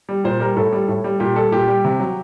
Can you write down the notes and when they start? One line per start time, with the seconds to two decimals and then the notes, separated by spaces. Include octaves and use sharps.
0.09 G3
0.24 A#2 C5
0.40 G3 A#4
0.56 A2 A4
0.72 G3
0.88 A2
1.04 G3
1.20 A#2 G4
1.36 G3 A4
1.52 A#2 G4
1.68 G3
1.84 C3
2.00 F#3